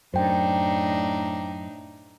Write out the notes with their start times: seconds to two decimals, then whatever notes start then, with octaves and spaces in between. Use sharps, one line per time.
0.14 F#2 A2 D4 D#4 C5 G5